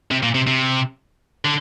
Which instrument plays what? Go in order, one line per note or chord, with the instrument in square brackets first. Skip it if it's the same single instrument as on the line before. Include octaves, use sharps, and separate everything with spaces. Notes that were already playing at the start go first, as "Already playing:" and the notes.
[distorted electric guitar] C3
A#2
C3
C3
D3